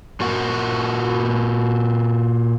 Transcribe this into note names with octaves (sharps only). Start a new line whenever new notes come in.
A#2 F#4 A#4 F#5